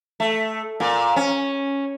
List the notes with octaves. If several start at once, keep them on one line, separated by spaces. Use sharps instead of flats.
A3
A#2
C#4